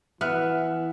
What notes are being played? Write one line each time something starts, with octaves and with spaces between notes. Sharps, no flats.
E3 B3 E5 F6 F#6